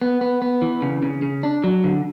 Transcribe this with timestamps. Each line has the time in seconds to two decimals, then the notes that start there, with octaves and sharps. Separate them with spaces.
0.02 B3
0.21 B3
0.42 B3
0.62 E3
0.82 C#3
1.03 C#3
1.22 C#3
1.43 D4
1.64 F#3
1.84 D3